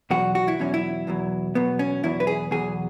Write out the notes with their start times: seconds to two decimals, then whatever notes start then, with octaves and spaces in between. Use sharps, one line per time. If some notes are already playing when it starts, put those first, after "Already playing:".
0.10 E2 B2 F#3 F#4
0.35 F#4
0.48 E4
0.59 E2 B2 F#3 C#4
0.74 E4
1.07 E2 B2 F#3
1.55 E2 B2 F#3 B3
1.79 C#4
2.03 E2 B2 F#3 E4
2.20 B4
2.27 G#4
2.51 E2 B2 F#3 G#4